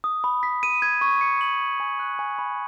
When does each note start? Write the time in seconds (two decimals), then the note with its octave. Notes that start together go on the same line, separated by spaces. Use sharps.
0.04 D#6
0.24 B5
0.43 B6
0.63 D#7
0.82 G#6
1.01 C#6
1.21 C#7
1.41 F#7
1.60 B5
1.80 G#5
1.99 F#6
2.19 G#5
2.39 B5